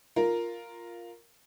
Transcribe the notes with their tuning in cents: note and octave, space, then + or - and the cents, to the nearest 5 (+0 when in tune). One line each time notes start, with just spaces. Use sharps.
F4 +0 A#4 +0